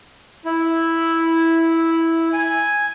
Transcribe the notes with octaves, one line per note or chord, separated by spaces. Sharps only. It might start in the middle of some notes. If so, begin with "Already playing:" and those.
E4
G#5